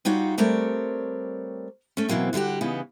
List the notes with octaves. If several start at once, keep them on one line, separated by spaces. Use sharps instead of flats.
G3 D#4 F4 F#4 C#5
G3 A3 C4 A#4 C#5 D5
A3 C#4
B2 E3 F#3 A#3 C4
D3 G3 E4 F#4 G4
C#3 E3 B3 D#4